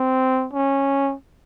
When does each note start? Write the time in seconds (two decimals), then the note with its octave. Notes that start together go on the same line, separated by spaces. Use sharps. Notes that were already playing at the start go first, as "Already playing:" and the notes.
Already playing: C4
0.53 C#4